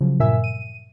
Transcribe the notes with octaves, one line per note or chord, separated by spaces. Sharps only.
C#3 F3 F#3
G2 A#2 A#4 E5 G#5 E6
D#7